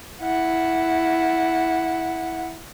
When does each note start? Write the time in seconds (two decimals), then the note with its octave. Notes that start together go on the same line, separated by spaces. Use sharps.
0.22 E4 F#5